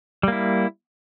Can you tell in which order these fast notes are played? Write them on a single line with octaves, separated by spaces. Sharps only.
G3 A#3 E4